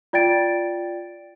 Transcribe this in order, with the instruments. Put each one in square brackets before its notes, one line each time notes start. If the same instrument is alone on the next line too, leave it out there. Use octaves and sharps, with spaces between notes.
[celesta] F4 D5 G5 A6 D7